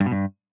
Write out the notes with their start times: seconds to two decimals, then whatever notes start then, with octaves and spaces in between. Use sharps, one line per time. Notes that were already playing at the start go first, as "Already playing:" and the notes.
0.01 G2
0.06 B2
0.12 G2